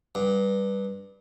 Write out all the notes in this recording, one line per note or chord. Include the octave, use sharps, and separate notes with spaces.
G2